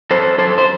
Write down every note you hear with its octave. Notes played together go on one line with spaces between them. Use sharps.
F#2 A4 C5
F#2 A4 C5
C5